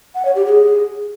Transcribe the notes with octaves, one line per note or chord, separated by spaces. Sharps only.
F#5
C#5
G4
G#4